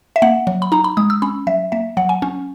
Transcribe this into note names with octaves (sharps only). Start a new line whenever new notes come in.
E5
A#3 F#5
F#3
B5
D#4 A#5
B5
G#3 D#6
E6
C#4 B5
F#3 E5
A#3 E5
F#3 F#5
G#5
C#4